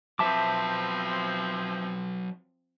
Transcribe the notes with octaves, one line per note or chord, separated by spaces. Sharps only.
F3 F#3 C4 B4 E5 A5 D6